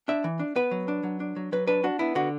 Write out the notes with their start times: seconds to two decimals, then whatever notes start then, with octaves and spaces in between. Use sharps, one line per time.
0.08 D4 E5
0.24 E3
0.39 D4
0.56 B3 B4
0.71 F#3
0.88 D4
1.03 F#3
1.20 D4
1.36 F#3
1.52 F#3 B4
1.67 D4 B4
1.84 D4 F#4
1.99 B3 E4
2.15 D3 F#4